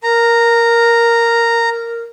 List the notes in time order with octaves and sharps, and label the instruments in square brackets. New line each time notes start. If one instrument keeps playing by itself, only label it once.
[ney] A#4 [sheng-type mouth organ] A#5